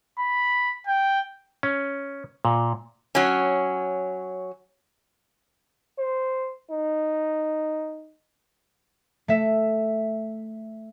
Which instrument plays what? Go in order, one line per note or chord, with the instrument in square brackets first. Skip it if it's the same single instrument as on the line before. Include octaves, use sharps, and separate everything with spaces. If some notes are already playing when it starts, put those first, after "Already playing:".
[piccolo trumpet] B5
G5
[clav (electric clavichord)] C#4
A#2
[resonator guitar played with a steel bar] F#3 C#4
[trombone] C5
D#4
[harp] A3 E5